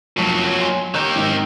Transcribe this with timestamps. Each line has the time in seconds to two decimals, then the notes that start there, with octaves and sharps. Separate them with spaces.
0.17 F1 A#2 F#3 A5 B6
0.61 G#5 C6
0.94 D#3 G4 A#5 F#6 G6
1.16 G#1 D#4